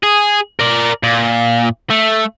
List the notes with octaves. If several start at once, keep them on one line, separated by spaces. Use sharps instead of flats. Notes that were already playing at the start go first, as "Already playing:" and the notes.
G#4
A#4 D5
A#2
A3